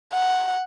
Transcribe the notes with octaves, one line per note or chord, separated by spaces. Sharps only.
F#5